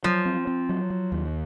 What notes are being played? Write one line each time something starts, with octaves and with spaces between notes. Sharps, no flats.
F3 F#3
C4
C4
F#3
F#3
D#2